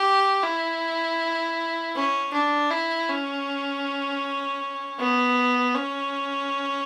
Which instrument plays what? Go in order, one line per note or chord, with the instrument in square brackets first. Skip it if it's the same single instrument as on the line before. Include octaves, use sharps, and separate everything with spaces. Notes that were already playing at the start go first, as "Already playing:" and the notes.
Already playing: [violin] G4
E4
C#4
D4
E4
C#4
B3
C#4